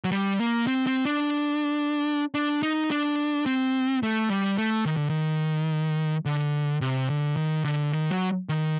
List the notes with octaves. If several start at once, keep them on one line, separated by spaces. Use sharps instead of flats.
F#3
G3
A#3
C4
C4
D4
D4
D#4
D4
C4
A3
G3
A3
D#3
D3
D#3
D3
C3
D3
D#3
D3
D#3
F#3
D#3